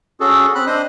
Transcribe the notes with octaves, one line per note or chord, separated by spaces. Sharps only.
C#4 F#4 G#4 A4
C4 B5 F#6
D4 C5 D#5 D#6